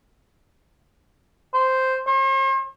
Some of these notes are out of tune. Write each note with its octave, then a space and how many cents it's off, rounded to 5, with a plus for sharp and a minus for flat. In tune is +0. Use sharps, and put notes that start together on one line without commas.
C5 -5
C5 +45